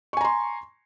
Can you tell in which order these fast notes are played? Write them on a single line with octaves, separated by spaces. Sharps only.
C#6 G#5 A#5 C6